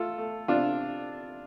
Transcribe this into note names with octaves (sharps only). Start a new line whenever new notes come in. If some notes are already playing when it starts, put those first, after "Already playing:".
Already playing: A3 F4 A4
A3
C3 D4 F4